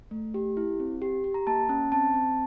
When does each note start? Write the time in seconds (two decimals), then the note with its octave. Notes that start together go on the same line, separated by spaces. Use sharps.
0.11 A3
0.34 G4
0.57 E4
0.80 C4
1.02 G4
1.24 G4
1.34 A#5
1.47 A#3 A5
1.69 C#4
1.92 C4 A5
2.14 C4